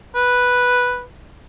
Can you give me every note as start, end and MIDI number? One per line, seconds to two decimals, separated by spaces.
0.15 1.04 71